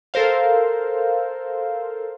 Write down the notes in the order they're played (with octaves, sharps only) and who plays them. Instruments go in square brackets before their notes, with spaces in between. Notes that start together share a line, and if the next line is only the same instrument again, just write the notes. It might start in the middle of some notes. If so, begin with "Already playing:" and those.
[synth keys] A4 A#4 C5 F5